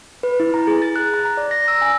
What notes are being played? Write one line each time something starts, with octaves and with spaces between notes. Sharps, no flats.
B4
E4
A#5
G#4
A6
F#6
A#5
A#5
D5
A#6
E6
G#5